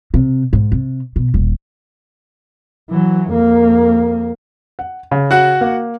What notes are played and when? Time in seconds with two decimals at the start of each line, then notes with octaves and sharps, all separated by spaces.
0.14 C3
0.53 G#2
0.72 C3
1.16 B2
1.34 D#1
2.90 E3 F#3
3.30 F2 A#3
4.79 F#5
5.11 C#3
5.31 F#4 F#5
5.61 A#3